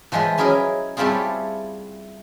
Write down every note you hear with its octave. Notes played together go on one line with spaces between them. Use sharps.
E3 F3 G#3 E4 B4
F#3 C#4 E4 G#4 A#4 D#5
G3 A3 C4 E4 F4 G#4